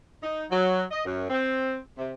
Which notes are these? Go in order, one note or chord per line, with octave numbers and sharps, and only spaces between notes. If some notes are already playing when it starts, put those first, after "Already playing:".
D#4
F#3
D#5
F#2
C4
C3